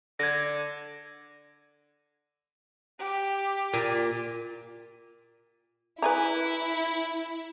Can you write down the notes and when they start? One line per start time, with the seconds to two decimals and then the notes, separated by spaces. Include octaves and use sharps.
0.19 D3 G#6 A#6
2.99 G4
3.74 A#2
6.02 E4 B4 G#5 A#5